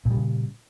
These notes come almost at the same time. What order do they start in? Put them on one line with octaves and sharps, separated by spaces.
A#2 G3 C#3